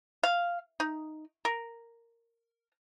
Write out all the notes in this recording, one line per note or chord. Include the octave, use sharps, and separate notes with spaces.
F5
D#4
A#4